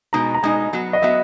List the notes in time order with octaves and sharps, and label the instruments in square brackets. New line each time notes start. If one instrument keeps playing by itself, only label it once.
[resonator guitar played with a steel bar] B2 G#3 D#4 [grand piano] A#5
[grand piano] A#5
[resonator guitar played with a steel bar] B2 G#3 D#4 [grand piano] G#5
[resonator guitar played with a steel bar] F#3 B3 F#4
[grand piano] D#5
[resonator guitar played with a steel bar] F#3 B3 F#4 [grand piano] E5